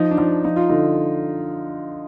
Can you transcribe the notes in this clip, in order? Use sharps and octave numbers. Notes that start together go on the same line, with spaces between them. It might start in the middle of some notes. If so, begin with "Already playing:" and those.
Already playing: F3 D#4
D4
F3 D#4
F3 D#4
F4
D3 D#4